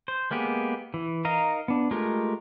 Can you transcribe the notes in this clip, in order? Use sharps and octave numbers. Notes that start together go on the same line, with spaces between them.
C5
G#3 A#3 B3 G4 G#4
E3
D#4 A#4 D#5 F5 A#5
B3 D4
G#3 A3 F4 G4 A#4